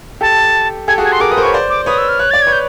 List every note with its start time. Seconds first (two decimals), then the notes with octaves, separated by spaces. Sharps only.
0.21 G4 A4 A5
0.87 G4 A4 G#5
0.98 F#4 G#4
1.04 G#5
1.12 C6
1.20 G#4 A#4 D6
1.31 B4 D#6
1.37 A#4 C5
1.42 B4 C#5 C#6
1.54 C5 D5
1.70 D6
1.86 B4 C#5 D#6
1.98 E6
2.09 F6
2.19 C#5 F#6
2.31 D5 A6
2.42 G#6
2.47 B4 C#5
2.53 G6